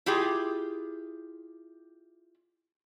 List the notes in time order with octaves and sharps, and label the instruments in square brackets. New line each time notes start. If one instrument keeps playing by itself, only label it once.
[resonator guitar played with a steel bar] E4 F4 G4 G#4